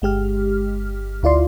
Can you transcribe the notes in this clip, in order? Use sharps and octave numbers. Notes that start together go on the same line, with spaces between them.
G1 G#3 G4 F6
D2 E4 F4 D5 C6